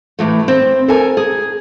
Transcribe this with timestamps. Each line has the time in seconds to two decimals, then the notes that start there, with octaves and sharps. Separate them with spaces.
0.19 A2 E3 F#3 A3
0.48 C4
0.88 A4 A#4 G#5
1.17 G#4